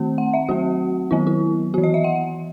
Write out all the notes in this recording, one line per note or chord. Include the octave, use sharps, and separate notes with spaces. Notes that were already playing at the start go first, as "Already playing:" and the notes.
Already playing: D#3 A3 C4
F#5
E5
F#3 A3 C4 F#4
D#3 F#3 B3 E4
E4
E3 B3 F#4
D#5
E5
F#5